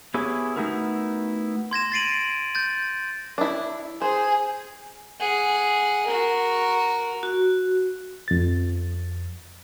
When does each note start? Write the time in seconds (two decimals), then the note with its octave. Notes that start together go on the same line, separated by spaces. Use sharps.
0.14 B3 E4 G4 G#4 C#5
0.56 A3 B3 D#4 E4 F#4 A#4
1.71 C6 G#6 A#6 E7
1.92 A6 A#6 C7 D7 D#7 F#7
2.55 G6 A6
3.38 D4 E4
4.02 G#4 C5
5.20 G#4 F#5
6.07 F#4 A#4
7.23 F#4
8.28 F2 A6